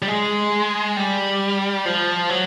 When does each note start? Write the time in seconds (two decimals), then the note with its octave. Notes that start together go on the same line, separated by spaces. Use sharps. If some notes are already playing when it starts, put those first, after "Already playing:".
0.02 G3
0.08 G#3
0.97 G3
1.85 F3
2.29 F#3